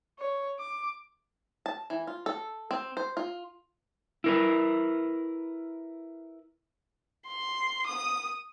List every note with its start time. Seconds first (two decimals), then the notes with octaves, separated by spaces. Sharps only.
0.19 C#5
0.59 D6
1.66 A5
1.90 E3
2.07 F4
2.26 A4
2.71 C4
2.97 C5
3.17 F4
4.24 E4 A#4 B4
7.27 C6
7.87 D#6